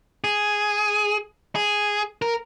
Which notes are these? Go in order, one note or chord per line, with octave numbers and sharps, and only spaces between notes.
G#4
G#4
A#4